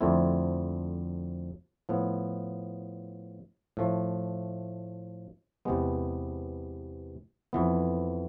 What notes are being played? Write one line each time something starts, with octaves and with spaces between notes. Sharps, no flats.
F2 D3 A3 C4 E4
A2 F3 B3
A2 F3 A3
E2 C3 G#3 B3
F2 E3 B3